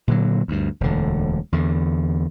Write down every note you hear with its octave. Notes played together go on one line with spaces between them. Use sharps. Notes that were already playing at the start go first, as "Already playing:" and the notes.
A#2 D3 F#3
D2 G2
E1 D2 D3
E2 D3